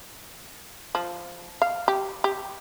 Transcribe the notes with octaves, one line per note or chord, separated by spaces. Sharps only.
F3
F5
G4
G4